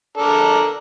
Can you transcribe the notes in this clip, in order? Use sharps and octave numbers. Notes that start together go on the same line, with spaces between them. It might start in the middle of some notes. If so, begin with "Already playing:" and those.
D4 A4 A#4